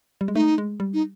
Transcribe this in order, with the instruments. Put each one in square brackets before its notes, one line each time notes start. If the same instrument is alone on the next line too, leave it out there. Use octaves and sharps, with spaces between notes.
[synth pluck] G3
G#3
[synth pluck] A3 [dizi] D#4
[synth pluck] G#3
G3
[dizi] D#4